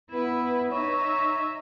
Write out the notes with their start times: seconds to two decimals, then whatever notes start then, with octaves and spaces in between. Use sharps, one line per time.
0.12 B3 E4 B4
0.72 D#4 C#5 E5